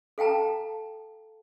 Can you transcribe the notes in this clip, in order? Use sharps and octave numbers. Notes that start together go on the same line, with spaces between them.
A4 F5 G5 A5 A#5